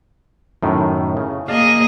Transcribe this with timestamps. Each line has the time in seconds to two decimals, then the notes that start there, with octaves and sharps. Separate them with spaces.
0.63 F#2 A2 D#3
1.17 C#3
1.48 A#3 G#4 D#5 F5 A5